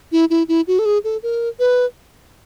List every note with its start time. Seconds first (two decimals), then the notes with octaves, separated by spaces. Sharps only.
0.12 E4
0.30 E4
0.48 E4
0.67 F#4
0.79 A4
0.85 G#4
1.04 A4
1.23 A#4
1.59 B4